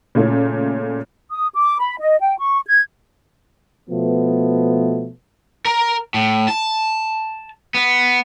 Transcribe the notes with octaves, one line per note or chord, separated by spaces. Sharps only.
A#2 C#3 A3 C#4
D#6
D6
B5
D#5
G5
C#6
G#6
B2 F3 A3 B3
A#4
A2
A5
B3